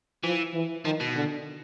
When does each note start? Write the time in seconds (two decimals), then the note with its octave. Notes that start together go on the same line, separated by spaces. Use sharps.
0.23 E3 F3
0.54 E3
0.85 D#3 F3
1.00 B2
1.16 D3